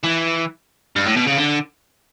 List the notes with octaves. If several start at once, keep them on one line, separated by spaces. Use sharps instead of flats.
E3
G2
A2
B2
C#3
D3